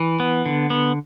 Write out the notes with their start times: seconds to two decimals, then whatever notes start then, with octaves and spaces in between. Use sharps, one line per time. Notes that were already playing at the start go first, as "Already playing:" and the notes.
Already playing: E3
0.20 B3
0.46 D3
0.70 B3